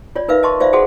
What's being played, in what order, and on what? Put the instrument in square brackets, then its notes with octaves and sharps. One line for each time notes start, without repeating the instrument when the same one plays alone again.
[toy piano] F4 C#5 D5
D#4 A#4 B4 E5 F5
D#5 A5 C6 C#6
F4 C5 D5 E5 F5
F#4 G#4 A4 C5 F#5 C6